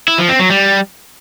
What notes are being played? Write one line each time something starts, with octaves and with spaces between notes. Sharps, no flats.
E4
F3
C4
F#3
G3